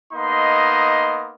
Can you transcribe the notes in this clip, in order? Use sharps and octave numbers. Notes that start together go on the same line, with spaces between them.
A#3 B3 D#4 D#5 C6